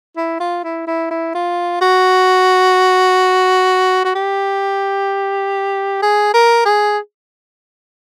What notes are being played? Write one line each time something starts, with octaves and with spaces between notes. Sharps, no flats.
E4
F4
E4
E4
E4
F4
F#4
F#4
G4
G#4
A#4
G#4